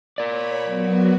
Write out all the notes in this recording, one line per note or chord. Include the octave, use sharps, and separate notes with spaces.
A#4 C#5 D5 B5
F#3 B3 F#4